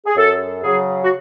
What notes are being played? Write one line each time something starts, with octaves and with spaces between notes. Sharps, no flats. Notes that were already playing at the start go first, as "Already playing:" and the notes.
G#4
F#2 A4
C#3 F#3 G#4
F#4